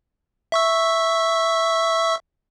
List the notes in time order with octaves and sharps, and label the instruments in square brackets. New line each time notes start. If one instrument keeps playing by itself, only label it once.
[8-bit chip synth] E5 C#6 E6